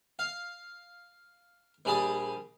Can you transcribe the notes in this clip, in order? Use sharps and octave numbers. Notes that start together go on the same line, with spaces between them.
F5
A#1 G3 G#4 A5 D#6